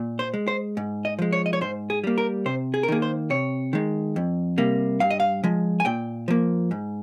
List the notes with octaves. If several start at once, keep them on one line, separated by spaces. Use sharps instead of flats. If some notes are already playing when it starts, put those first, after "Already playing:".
Already playing: A#2
C5
G#3
C5
G#2
D#5
F3 G#3
C#5
D#5
C#5
G#2 C5
G#4
G3 A#3
A#4
C3 C5
G#4
A#4
D#3 A#3 G#4
C5
C3 C#5
D#3 G#3
F2
C3 G3 A#3
G2 F5
D#5
F5
F3 G#3
G#5
A#2 G5
F3 A#3
G#2